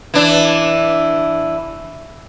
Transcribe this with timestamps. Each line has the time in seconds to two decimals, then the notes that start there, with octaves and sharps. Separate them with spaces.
0.14 E3 D4